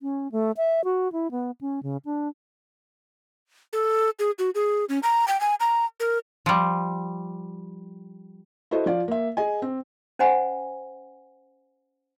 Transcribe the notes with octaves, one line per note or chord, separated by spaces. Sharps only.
C#4
A3
E5
F#4
E4
B3
C#4
C#3
D4
A4
G#4
F#4
G#4
C#4
A#5
G5
G#5
A#5
A#4
F3 G3
E4 F#4 A4 C5 D#5
F3 D5 F5
A#3 E5
G#4 D#5 G#5
C4
C#4 C5 D#5 F#5 G#5 B5